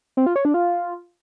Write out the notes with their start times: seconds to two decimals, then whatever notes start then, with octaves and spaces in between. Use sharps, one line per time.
0.17 C4
0.26 F4
0.36 C#5
0.45 D4
0.54 F4